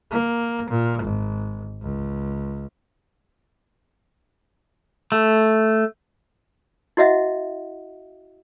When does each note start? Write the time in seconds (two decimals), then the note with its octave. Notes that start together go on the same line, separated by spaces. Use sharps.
0.11 A#3
0.70 A#2
1.03 G#1
1.82 C#2
5.12 A3
6.97 E4 F#4 D#5 E5 F#5